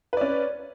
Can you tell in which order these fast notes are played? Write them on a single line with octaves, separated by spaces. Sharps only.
B4 D5 C#4